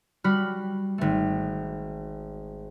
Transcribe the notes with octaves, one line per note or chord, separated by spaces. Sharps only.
G3 F#4 B5 F6
G#1 A3